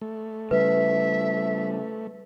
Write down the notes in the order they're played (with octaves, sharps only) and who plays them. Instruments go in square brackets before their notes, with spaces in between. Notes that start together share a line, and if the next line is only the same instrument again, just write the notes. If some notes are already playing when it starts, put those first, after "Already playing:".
[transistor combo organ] A3
[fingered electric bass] C#3 G3 [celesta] B4 [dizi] E5